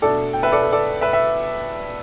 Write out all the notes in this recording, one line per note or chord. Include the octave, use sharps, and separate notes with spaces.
B2 A3 D4 A4 D5
G5
B4 E5
A4 D5
A4
A4 D5
B4 E5
E5